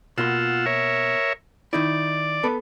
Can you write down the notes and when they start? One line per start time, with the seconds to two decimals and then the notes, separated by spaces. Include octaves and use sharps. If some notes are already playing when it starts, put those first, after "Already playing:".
0.18 B2 A#3 F4 F#5 C6 E6
0.66 A#4 C#5 E5
1.73 D#3 D#4 E4 D5
2.43 B3 A4 B4